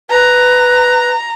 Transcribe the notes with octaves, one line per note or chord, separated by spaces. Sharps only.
B4 A#5